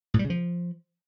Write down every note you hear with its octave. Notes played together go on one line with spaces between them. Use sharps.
A2
G3
C#3
F3